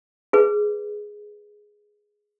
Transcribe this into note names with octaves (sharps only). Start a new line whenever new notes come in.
G#4 B4